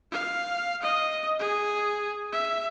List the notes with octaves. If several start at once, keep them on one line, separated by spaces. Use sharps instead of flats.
F5
D#5
G#4
E5